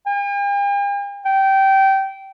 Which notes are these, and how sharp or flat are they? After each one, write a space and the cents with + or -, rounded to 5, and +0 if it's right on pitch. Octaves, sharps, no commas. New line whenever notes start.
G5 +45
G5 -20